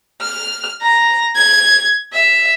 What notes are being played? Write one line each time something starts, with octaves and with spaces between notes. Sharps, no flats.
F6
A#5
G#6
E5